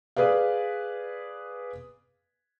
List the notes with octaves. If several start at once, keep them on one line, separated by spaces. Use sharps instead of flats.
G#4 B4 D5 F5